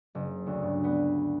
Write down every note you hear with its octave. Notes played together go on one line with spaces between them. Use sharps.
F#1
D2
G2
B3